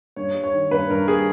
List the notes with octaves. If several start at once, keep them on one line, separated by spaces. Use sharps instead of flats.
G2 C#5
G3
C#5
D#3
G2 B4
G2 A#4
G3 G#4